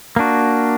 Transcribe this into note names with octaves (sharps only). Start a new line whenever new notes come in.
A#3 D4 F#4